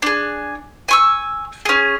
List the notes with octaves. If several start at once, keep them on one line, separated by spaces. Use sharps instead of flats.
D4 G#4
G#5 C#6 E6
C#4 G#4